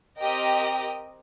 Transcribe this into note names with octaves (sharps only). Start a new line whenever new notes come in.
C4 G4 A#4 D#5 G5